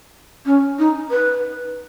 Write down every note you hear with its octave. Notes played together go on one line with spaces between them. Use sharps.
C#4
D#4
B4